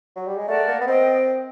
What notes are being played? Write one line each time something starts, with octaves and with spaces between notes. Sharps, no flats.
F#3
G3
G#3
A3 A#4 D5 F#5 A5
A#3
B3
C4 A#4 D#5 G5